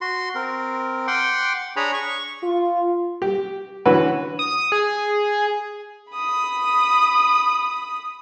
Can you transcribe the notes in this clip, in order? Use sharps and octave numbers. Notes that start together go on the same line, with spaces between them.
F#4 C6
C4 A#4
F#5 G5 C6 D6
D4 G#4 C#5 G#5 A#5 B5
C#6
F4
G4
D3 E3 C#4 F#4 B4
D#6
G#4
B5 D#6